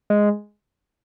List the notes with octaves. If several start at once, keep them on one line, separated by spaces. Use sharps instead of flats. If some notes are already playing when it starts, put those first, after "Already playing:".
G#3